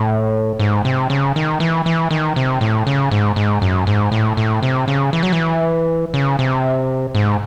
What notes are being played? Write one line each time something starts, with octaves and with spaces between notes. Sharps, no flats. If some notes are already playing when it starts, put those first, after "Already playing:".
Already playing: A2
G#2
C3
C#3
D#3
E3
E3
D#3
C3
A2
C#3
G#2
G#2
F#2
G#2
A2
A2
C3
C#3
E3
F#3
E3
C#3
C3
G#2